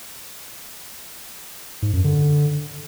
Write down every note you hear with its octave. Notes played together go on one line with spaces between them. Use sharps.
G#2
F#2
D3